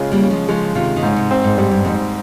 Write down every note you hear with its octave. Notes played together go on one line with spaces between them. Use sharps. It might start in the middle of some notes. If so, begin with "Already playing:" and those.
Already playing: C#3 G#3 F4
G3 A#3
C#4
F3 G#3
C#3 F3 G#3
C3 D#3 F4
D#3
G#2 C#3
C3
C4
G#2
G#2 G3
G2
F2 G#2